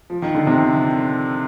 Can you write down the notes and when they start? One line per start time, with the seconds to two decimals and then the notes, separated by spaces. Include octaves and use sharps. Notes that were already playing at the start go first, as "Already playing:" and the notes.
0.10 F3
0.22 D#3
0.34 D3
0.47 C3 D#3